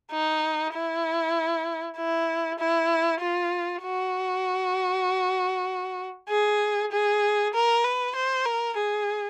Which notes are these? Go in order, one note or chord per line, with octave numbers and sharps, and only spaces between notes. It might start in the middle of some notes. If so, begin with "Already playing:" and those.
D#4
E4
E4
E4
F4
F#4
G#4
G#4
A#4
B4
C5
A#4
G#4